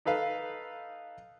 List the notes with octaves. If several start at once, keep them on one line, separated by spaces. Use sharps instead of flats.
D#4 A4 B4 F5